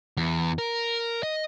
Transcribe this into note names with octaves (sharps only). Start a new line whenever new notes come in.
E2
A#4
D#5